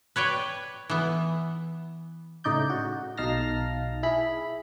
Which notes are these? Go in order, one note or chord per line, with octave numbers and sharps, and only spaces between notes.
B4 C#5 D5 G5
E3 B3
A2 C#3 D#4 D5 G6
F#4
B1 D#4 F5 A5 F6 A#6
E4 G#4 B5